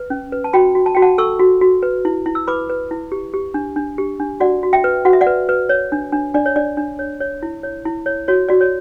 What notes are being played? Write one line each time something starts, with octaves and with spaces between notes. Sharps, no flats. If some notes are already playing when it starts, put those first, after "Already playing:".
Already playing: B4
C#4
B4
A5
F#4 G5 B5
F#4
A5
F#4 G5
F#5 A5
A4 C#6 E6
F#4
F#4
B4
E4
E4
E6
B4 B5 D6
B4
E4
G4
G4
D4
D4
G4
D4
F#4 D5 F#5
F#4
E5 G5
B4
F#4 F#5
E5
D5 F#5
B4
B4
C#5
D4
D4
D4 D5
C#5
D4 D5
D4
C#5
C#5
E4
C#5
E4
C#5
F#4 C#5
F#4 D5
C#5